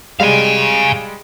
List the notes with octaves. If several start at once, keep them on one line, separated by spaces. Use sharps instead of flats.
G3 G#3 F5 G#5